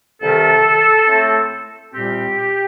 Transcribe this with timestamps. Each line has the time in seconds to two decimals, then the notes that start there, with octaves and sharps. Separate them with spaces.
0.21 C2 C3 D#3 G3 A4
1.07 A2 A3 C4
1.94 C2 A#2 G3 C4 G4